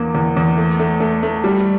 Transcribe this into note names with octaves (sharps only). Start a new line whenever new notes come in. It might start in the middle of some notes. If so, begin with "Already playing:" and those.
Already playing: E2 A#3
E2
E2
A3
A3
A3
A3
G3